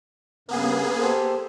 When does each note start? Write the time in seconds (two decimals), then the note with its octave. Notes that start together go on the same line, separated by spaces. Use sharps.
0.49 G2 C#3 A#3 B3 G#4
0.98 G4 A4 C5